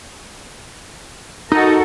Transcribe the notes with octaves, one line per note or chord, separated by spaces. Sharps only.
D#4 F#4 A4 A#4